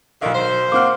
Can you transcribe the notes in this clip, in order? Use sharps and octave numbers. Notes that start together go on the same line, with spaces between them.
B1 D3 D#3 F5
C5
A#3 C4 F#5 D6 F6